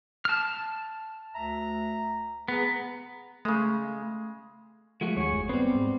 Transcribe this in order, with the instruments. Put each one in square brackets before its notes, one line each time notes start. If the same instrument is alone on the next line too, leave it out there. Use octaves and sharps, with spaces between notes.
[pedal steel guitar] A5 F6
[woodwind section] D2 E5 A#5
[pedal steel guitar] B3 [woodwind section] G#4 A#5
[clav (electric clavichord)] C#3 G#3 [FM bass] A3
[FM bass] F3 [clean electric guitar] G#3 A3 F#4
[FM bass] D#2 [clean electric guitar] G#4 C#5
[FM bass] F#1
[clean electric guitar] G3 C4 [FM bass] B3
[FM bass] G#2